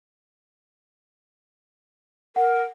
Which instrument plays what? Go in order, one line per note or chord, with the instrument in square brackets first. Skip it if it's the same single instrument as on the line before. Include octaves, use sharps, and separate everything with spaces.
[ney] A#4 [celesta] F#5